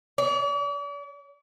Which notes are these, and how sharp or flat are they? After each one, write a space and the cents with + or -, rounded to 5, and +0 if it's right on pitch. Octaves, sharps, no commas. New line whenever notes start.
D5 -45